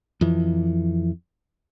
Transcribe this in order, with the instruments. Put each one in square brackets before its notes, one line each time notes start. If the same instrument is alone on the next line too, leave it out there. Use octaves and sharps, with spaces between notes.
[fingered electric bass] F2 E3